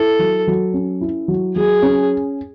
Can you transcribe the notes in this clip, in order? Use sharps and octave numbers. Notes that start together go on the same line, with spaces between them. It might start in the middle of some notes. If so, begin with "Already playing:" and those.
Already playing: E4 A4
F#3
F#3
C#4
E4
F#3
F#3 G#4
C#4